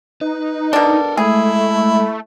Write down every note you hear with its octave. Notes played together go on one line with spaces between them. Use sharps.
D#4 B4
B2 D4 A4 A#4
G#3 A3 E4 G#4